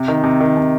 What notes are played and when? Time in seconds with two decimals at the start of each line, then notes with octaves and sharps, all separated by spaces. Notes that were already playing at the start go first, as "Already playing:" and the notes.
Already playing: C3
0.08 D#3
0.24 C3
0.40 D#3
0.57 C3